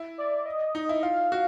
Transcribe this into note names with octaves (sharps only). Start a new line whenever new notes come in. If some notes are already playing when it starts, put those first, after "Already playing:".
Already playing: E4
D5
D#5
D#4
E4
F4 F5
F#4